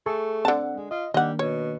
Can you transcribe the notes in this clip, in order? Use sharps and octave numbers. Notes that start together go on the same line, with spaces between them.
A3 G#4 A4 C#6
D3 C4 F#5 A5
G#3
F4 D#5
D#3 G3 A#3 D4 D#5 F#5
B2 C#5